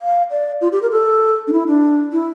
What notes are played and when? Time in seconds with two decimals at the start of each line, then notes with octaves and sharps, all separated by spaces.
0.02 F5
0.31 D5
0.61 F4
0.72 G4
0.82 A#4
0.91 A4
1.48 D4
1.53 E4
1.67 D4
2.12 E4